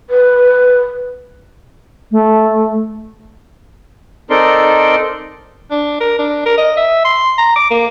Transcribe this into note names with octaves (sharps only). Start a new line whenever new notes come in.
B4
A3
C4 D#4 A4 A#4 D5 C6
D4
A#4
D4
A#4
D#5
E5
C6
A#5
D6
A#3